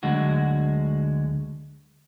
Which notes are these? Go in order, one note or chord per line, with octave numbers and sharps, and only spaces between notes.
D2 D3 F#3 G#3 F#4